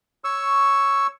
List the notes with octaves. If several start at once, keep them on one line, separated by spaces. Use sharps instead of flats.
C#5 C#6 E6